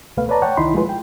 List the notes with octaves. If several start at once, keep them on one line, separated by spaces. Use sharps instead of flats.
C#2 B2 A3 B4 F5
B4 C#5 D5 A5 A#5
C#5 F#5 G5 C#6
C2 D#3 D#4 E4 B5 C6
F3 G#3 A3 F4 G#4 B4
G5